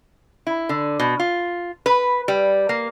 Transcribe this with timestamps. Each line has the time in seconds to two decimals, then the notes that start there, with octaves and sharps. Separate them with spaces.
0.47 E4
0.69 D3
1.00 B2
1.20 F4
1.86 B4
2.28 G3
2.69 A#3